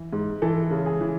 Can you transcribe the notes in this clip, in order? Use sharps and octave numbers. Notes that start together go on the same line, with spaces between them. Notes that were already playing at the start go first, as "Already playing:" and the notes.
Already playing: E3
G#2
E3 A4
C#3
G#4
E3